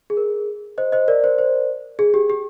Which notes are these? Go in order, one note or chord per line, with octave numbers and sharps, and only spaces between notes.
G#4
A#4
C5 D#5
C5 D#5
A#4 D5
C5
C5
G#4
G4
G4